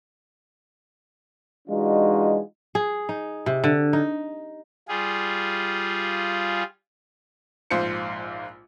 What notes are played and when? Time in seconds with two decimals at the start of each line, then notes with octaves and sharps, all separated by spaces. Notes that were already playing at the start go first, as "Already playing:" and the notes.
1.68 E3 G#3 D4 D#4 F4 F#4
2.75 G#4
3.09 D#4
3.46 C3
3.64 D3
3.93 D#4
4.88 G3 F4 G#4
7.71 A#1 G#2 F4 C5 C#7